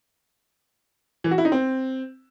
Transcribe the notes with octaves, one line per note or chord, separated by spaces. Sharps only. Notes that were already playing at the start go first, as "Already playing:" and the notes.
E3
F#4
E4
D#4
C4